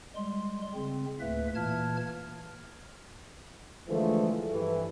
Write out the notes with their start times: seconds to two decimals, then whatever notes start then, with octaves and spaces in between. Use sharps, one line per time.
0.16 G3 G#3 C6
0.75 C#3 C4
1.20 D2 A2 A#3 B4 E5
1.55 A#2 E3 A#3 A5 F6 G#6
3.88 D3 E3 F3 G#3 A3
4.51 G2 E3